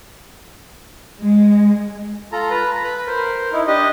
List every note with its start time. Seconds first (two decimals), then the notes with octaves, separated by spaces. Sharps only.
1.20 G#3
2.32 F4 A4 A#5
2.50 B4 A#5
2.84 B4 B5
3.07 A#4 C5
3.52 D#4 E4
3.67 D4 G4 D#5